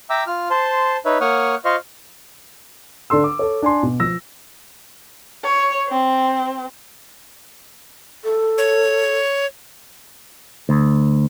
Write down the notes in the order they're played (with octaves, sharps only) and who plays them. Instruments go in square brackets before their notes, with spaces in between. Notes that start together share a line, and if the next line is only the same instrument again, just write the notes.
[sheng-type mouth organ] E5 G5 A#5 D6 E6
F4 F6
C5 A5 C6
D#4 B4 C#5 E5
A#3 C#5 F#5 C#6 D#6 F6
F4 C5 D#5 F5 C#6 F6
[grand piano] D3 D4 A4 C6 E6
D6
A4 C#5
D4 G#5 C6
B2
F3 E6 A#6
[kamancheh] C#5
C4
[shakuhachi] A4
[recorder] C#5
[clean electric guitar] D2